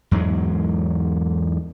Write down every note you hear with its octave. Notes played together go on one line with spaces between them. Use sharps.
E2 G#2 F#3 G#3